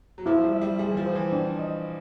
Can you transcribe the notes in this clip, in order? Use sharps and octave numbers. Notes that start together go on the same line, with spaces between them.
F#3
F3 E4
G3
E5
G3
G3 G#4
E3
F3
C5
E3
D4
D#5